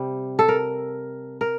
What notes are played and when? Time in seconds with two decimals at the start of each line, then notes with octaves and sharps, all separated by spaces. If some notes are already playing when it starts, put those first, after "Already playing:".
Already playing: C3 G3
0.39 A4
0.48 A#4
1.41 A#4